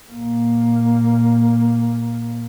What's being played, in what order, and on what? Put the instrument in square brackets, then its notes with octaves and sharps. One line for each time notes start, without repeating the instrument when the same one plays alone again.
[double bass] A#2 A#3